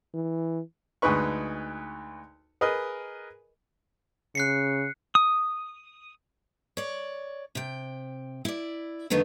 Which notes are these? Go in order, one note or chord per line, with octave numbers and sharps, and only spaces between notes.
E3
D2 G#3 D#4 B4 C#6
G#4 A#4 B4 D#5
C#3 F#6 C7 C#7
D#6
C#5 D5
C3 G5
E4 D5
F2 D3 D#3 A3 B3 D#4